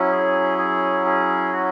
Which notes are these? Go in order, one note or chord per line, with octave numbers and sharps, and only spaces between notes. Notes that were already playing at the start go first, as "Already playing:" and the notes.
Already playing: F#3 C#4 E4
G#4
G#4
G#4
F#4